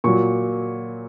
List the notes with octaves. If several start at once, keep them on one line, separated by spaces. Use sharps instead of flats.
A#2 F#3 C#6